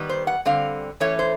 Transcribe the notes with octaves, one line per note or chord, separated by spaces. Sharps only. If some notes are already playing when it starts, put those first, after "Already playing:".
Already playing: D#3 G3 B3
C5
F#5
D3 G3 C4 F5
E3 A3 C#4 C#5
C5